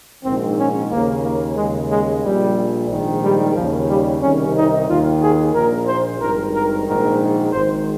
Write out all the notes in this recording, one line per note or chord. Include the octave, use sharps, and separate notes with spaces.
A#1 G#2 D#3 C4
C#4
D#2 C#3 A#3
A#3
D#2 C#3 G#3
G#3
A#1 A#2 G3
A#1 G#2 D#3
G3
D#2 C#3 F3
G3
C2 C3 D#3 C#4
D#4
D#2 D#3 F4
G#4
A#1 A#2 A#4
C5
G#1 G2 D#3 A#4
A#4
A#1 G#2 D#3 A#4
G#1 G#2 D#3 C5